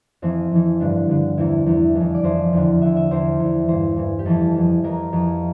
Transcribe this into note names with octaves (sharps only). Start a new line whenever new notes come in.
F2 E3 C4
F2 E3
G2 D3 D4
G2 D3
E2 C3 E3 E4
E2 C3 E3
F2 E3
D5
F2 E3 C5
E2 D3
E2 D3 E5
E5
E2 E3 C5
E2 E3
G2 E3 C5
G2 E3
G4
F2 E3 A4
F2 E3
F2 E3 A#4
F2 E3